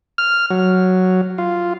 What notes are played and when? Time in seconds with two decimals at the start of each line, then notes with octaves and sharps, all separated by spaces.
0.18 F6
0.50 F#3
1.38 F4